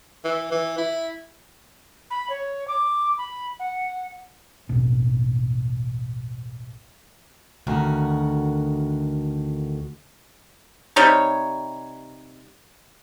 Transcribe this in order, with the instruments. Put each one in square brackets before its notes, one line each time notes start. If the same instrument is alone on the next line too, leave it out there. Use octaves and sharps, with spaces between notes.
[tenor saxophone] E3
E3
E4
[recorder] B5
C#5
D6
B5
F#5
[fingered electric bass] A1 E2 B2
[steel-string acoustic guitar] D2 D#3 F#4 A#4
[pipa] C3 G3 D#4 C#5